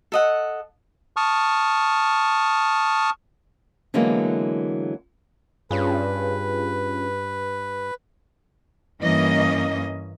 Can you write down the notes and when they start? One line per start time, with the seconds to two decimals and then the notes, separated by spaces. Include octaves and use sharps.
0.12 A4 D#5 F#5
1.17 A5 C#6 D#6 F6
3.94 D3 E3 F#3 G#3 A#3 B3
5.71 G2 C#4 F4 G#4 B4
9.01 G2 E3 A#3 C#4 D#5